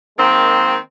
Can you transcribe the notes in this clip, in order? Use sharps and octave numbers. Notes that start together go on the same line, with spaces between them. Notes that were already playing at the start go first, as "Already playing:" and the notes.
D#3 G#3 A#3 C4